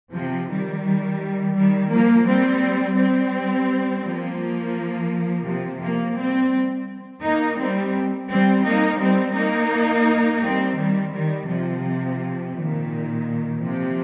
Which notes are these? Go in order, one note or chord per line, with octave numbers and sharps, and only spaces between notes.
C3 F3
D#3 G3
D#3 G3
F3 A#3
G3 C4
G3 C4
F3 A#3
C3 F3
F3 A#3
G3 C4
A#3 D#4
G3 C4
G3 C4
A#3 D#4
G3 C4
A#3 D#4
G3 C4
D#3 G3
D#3 G3
C3 F3
A#2 D#3
C3 F3